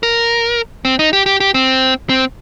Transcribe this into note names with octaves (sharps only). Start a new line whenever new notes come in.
A#4
C4
D#4
G4
G4
G4
C4
C4